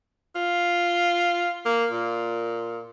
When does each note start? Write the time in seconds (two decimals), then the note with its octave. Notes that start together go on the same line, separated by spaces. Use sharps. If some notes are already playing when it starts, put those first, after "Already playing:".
0.35 F4
1.65 A#3
1.91 A#2